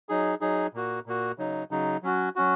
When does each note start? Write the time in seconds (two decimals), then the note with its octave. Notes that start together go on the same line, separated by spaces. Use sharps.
0.09 F#3 D#4 G#4
0.41 F#3 D#4 G#4
0.74 A#2 A#3 F#4
1.06 A#2 A#3 F#4
1.38 C#3 F#3 D#4
1.71 C#3 F#3 D#4
2.03 F#3 C#4 F#4
2.36 F#3 C#4 F#4